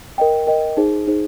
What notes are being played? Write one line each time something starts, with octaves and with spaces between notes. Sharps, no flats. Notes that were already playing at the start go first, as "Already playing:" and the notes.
A#4 D#5 G5
A#4 D#5 G5
D#4 G#4 C5
D#4 G#4 C5